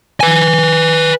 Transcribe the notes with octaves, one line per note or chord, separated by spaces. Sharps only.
B4 G#5